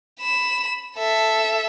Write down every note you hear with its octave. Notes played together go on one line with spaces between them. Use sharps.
B5 E7
A4 E5